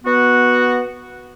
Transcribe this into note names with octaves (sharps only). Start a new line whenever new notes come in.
B3 F#4